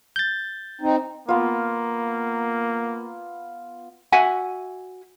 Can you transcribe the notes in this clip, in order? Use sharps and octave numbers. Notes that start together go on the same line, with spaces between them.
G6 A6
C4 D#4
A#3 B3 F4
F#4 E5 F#5 G#5